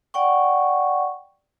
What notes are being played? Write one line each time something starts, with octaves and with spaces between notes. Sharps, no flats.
D5 F#5 G5 C#6